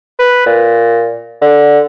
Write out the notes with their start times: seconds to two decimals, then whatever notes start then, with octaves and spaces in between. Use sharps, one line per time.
0.19 B4
0.46 A#2
1.41 D3